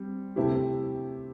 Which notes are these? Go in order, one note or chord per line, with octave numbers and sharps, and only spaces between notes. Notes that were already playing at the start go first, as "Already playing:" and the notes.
Already playing: G3 C4
C3 A3 C4 E4 G4